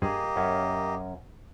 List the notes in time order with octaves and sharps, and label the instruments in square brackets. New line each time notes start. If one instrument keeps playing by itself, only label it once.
[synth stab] G2 [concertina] A#3 G4 D#5 [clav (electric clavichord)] G#4
[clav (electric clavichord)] F#2 C#4